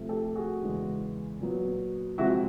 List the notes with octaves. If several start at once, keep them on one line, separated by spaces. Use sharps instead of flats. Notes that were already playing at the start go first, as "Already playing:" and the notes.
Already playing: C3 F3 A3
G4 A4
F#4 G#4
E2 C#3 E3 G#3 B3
A#2 F#3 B3
C3 F3 G#3 C4 E4 F#4